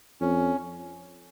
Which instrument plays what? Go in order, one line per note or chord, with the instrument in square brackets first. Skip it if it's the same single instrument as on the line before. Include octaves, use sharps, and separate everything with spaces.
[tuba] F2 [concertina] C#4